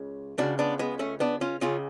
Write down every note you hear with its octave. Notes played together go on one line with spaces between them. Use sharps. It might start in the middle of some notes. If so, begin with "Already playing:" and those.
Already playing: C#2 C#3
C#2 C#3 D4 F#4
B3 D4
G#3 B3
A3 C#4
B3 D4
C#4 F4
C#2 C#3 C#4 F4